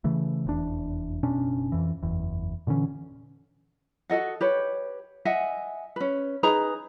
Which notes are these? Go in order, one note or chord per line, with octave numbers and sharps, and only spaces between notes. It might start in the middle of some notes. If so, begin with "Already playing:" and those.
C#3 E3 A3
F1 E2 D4
F#1 B2 C#4 D4
F2 E3
F#1 E2
A#2 D3 E3 C#4
F#4 A4 D#5 F#5
G4 B4 C#5
D#5 E5 F#5 G#5
C#4 B4
D#4 G#4 B4 A#5